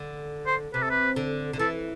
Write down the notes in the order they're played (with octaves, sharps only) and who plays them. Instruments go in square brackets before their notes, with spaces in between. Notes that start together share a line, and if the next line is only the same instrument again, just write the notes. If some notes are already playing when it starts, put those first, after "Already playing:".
Already playing: [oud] D3
[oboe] C5
[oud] C3 [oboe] B4
[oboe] A4
B4
[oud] D3
D3
[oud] E3 [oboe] A4